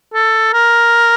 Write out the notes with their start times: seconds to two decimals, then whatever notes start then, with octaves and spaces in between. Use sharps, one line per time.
0.14 A4
0.53 A#4